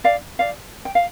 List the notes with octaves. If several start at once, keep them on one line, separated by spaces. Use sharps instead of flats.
D5 F5
D5 F5
G5
F5